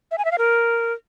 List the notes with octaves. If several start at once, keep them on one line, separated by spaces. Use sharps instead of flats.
E5
G#5
E5
F5
A#4